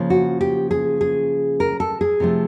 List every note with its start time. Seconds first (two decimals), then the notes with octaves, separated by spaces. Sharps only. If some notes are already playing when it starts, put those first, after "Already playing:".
Already playing: C#3 F3 A#3
0.10 F#4
0.41 G4
0.71 G#4
1.01 G#4
1.60 A#4
1.80 A4
2.01 G#4
2.20 C3 F3 A3